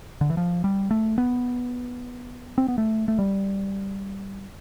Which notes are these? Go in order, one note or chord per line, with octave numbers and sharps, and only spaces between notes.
D3
E3
F3
G3
A3
B3
C4
B3
A3
A3
G3